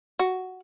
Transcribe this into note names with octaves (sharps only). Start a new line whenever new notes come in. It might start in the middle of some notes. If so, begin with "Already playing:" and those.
F#4